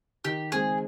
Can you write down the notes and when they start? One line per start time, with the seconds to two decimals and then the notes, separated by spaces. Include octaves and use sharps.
0.24 D#3 G4
0.52 G#3 C4 G#4